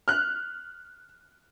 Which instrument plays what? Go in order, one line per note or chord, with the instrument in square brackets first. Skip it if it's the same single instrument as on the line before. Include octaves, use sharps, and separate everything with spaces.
[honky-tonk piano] F6 F#6